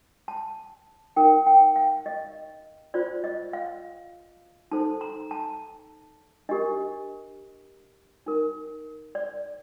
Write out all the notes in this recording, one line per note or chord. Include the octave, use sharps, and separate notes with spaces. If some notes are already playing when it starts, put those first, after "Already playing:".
A5
D#4 A#4 G5
G5
F5
D#5
F4 C5 D5
D#5
F5
D#4 A4 C5 A5
A#5
A5
D4 G4 A#4 D#5
D#4 A#4
D5